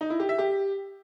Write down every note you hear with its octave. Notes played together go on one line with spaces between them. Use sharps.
D#4
E4
G4
E5
G4